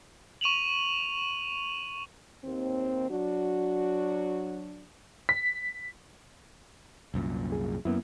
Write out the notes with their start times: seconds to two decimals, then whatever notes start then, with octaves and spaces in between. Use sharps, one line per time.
0.41 C#6 D#7 F7 F#7
2.44 D#2 C4
3.09 F#3 D4 F#4
5.29 B6
7.14 C2 F#2 A#2
7.52 G#4
7.85 F#2 A#3 B3 E4